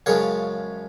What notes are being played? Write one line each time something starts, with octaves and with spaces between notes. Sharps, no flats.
F#2 C#3 F3 G#3 C#5 F5